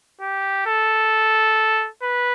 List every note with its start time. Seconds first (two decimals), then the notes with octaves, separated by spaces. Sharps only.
0.21 G4
0.66 A4
2.02 B4